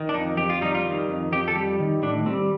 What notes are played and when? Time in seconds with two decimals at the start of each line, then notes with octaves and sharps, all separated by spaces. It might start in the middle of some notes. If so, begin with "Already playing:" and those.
Already playing: D#3
0.09 D4
0.14 F2 D#4
0.37 F2 G4
0.50 F4
0.61 G3 D#4
0.75 F4
0.84 D#3
1.08 F2
1.32 F2 G4
1.48 A4
1.55 G3 G4
1.80 D#3
2.03 A2 D4
2.26 G3 C4